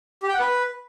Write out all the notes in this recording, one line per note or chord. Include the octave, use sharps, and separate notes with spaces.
G4
G5
F#5
B4